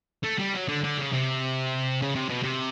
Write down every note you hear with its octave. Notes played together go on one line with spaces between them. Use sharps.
A3
G3
F#3
D3
D3
C#3
C3
C#3
C3
B2
C3